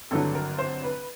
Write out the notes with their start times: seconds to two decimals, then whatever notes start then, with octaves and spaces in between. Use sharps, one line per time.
0.11 G#1 G2 D3 F#3 A4
0.35 A#4
0.58 C5
0.83 B4